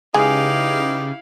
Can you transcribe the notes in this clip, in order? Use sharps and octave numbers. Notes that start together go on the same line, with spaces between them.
C#3 G#3 D#4 E4 G4 G#4 B4 F5